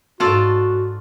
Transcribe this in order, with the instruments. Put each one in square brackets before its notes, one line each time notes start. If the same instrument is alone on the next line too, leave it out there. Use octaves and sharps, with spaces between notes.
[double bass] G#2 [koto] F4 A4 D5 [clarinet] F#4